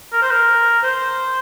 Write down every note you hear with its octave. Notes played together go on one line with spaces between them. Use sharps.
A#4
C5
A#4
C5